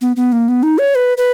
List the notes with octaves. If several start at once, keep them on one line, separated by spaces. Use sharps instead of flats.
B3
B3
A#3
B3
D#4
C#5
B4
B4